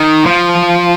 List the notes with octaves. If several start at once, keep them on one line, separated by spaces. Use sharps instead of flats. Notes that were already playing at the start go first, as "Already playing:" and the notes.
Already playing: D#3
F3